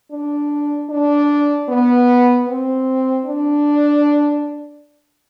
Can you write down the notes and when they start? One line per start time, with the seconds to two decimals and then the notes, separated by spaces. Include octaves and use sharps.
0.12 D4
0.90 D4
1.69 B3
2.48 C4
3.26 D4